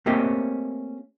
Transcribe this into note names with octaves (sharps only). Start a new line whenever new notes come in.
A3 A#3 C4 C#4 G4 D#5